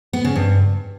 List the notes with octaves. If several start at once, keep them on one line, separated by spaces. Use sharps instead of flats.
B3
C#3
G2